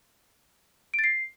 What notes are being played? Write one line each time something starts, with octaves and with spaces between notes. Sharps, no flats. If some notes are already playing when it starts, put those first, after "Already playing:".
D7
A6
C7